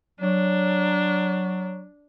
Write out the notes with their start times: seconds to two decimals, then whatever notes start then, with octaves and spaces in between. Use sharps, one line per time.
0.20 F#3 D4